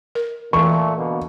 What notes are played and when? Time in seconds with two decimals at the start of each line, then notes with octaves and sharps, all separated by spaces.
0.15 A#4
0.53 A#2 E3 A3 C#6
0.97 B2 D3 A#3